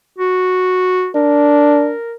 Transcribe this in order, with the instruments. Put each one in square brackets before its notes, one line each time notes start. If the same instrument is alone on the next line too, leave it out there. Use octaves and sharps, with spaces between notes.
[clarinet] F#4
[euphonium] D4 [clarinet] A#4